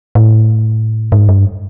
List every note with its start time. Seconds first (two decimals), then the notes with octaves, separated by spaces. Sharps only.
0.15 A2
1.12 G#2
1.29 G2